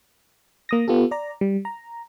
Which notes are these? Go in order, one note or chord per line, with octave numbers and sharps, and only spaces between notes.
A#3 D#6 A#6
B3 F4 G4 A4
D5 A#5
G3
A#5